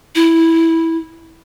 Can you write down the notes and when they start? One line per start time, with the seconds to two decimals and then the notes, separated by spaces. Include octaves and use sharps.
0.15 E4